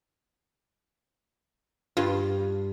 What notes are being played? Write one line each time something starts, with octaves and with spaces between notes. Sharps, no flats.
G2 F4